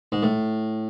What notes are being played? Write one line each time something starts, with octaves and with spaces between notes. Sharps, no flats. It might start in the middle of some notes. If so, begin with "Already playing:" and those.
G#2
A2